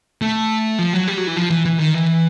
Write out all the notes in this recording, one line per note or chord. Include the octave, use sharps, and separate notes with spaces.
A3
F3
F#3
G3
F#3
E3
F3
E3
E3
D#3
E3